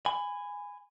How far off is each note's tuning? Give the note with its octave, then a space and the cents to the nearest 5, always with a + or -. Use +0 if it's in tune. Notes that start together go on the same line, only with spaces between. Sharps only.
G#5 -10 B5 +20